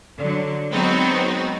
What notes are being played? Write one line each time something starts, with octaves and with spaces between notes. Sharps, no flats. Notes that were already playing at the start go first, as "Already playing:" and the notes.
D3 F#3
F#3 G#3 B3 C4 D#4 F#4